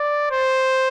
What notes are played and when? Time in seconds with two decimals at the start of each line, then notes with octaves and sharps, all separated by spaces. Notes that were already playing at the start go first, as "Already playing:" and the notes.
Already playing: D5
0.31 C5